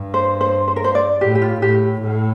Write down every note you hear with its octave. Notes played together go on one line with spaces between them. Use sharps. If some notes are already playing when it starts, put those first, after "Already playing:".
Already playing: G2
C5
C5
C5
A#4
C5
D5
A2 G4
G4
F4
A2 G4
A2